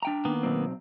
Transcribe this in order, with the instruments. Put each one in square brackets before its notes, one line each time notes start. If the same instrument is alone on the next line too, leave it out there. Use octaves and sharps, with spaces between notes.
[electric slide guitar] D4 G5 A#5
[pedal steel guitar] D#3 A#3 B3
[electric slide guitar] B2 F#3 C4